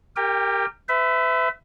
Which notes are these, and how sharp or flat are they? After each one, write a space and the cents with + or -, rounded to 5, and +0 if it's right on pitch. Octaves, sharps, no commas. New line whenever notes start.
G4 +0 A#4 -15 G5 +35
B4 +40 E5 +0